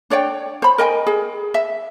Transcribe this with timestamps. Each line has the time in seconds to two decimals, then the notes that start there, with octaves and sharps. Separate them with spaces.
0.10 D4 C#5 D5 G5
0.62 C5 B5
0.78 A#4 D#5 G5 G#5
1.07 G#4
1.54 E5